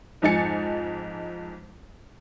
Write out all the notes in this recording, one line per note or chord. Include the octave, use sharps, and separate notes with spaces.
F2 G#2 D#4 G#5 A6 C#7